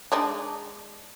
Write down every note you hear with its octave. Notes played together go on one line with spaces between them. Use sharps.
G#3 D4 D#4